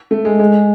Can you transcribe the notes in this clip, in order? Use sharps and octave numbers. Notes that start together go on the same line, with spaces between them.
A3
G#3
G#3